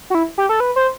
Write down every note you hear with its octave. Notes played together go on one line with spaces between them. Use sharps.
F#4
E4
G4
A4
B4
C5